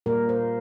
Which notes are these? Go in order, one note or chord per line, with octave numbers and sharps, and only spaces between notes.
A#2 G3 A#3 A#4
C5